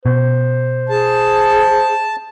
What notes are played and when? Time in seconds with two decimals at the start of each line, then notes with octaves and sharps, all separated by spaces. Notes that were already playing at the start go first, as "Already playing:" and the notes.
0.06 B2 C5
0.89 G#4 A5